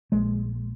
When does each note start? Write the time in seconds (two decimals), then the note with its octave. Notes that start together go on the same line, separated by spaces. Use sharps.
0.12 A#1 G#3